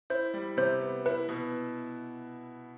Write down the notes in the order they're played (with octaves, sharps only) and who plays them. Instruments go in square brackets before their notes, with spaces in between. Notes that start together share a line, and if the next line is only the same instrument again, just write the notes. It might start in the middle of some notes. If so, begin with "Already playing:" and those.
[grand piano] E4 [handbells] C5
[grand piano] G3
[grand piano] C3 [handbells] C5
[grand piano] B3
[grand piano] E4 [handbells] B4
[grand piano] B2